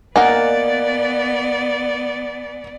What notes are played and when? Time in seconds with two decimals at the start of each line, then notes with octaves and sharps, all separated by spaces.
0.16 A#3 B3 D#4 A#4 D5 F#5 G#5